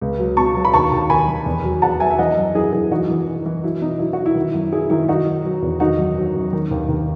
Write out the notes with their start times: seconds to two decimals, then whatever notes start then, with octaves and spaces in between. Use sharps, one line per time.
0.01 C#2
0.19 F#3
0.37 B2 A5 C#6
0.55 F#3
0.65 B5
0.74 D#2 A5 C#6
0.92 D#2
1.09 D#2 G#5 B5
1.28 D#3
1.46 E2
1.64 F#3
1.82 E2 F#5 A5
2.00 F#3 E5 G#5
2.11 E5
2.19 E3 D#5 F#5
2.37 F#2
2.54 F#2 E4 G#4
2.73 F#2 E4 G#4
2.91 E3 D#4 F#4
3.10 E3
3.27 E3
3.46 E3
3.63 F#3 E4
3.81 B2 D#4
3.99 F#3 E4
4.13 F#3 F#4
4.26 E4
4.35 D#3
4.54 F#2
4.72 F#3 E4 G#4
4.90 D#3 E4
5.08 D#3 D#4 F#4
5.26 F#3
5.45 F#3
5.62 E2
5.80 D#3 D#4 F#4
5.99 F#2
6.17 F#3
6.35 F#2
6.53 D#3
6.71 D#2
6.89 D#2